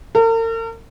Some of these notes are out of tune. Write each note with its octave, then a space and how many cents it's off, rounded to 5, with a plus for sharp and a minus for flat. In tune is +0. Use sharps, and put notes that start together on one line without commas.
A#4 -45